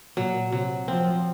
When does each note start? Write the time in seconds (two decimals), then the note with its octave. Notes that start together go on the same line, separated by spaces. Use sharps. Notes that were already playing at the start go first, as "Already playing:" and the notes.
0.17 A#2 F#3
0.52 C3 F#3
0.88 F3 C4